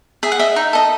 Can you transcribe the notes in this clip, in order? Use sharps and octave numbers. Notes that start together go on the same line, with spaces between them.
G#4 E5
F#5
D#5 E5
D#4
A4 D#5